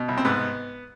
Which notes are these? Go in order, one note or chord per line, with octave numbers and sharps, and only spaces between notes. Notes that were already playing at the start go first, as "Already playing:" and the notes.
Already playing: B2
C2
C4
G#2 B3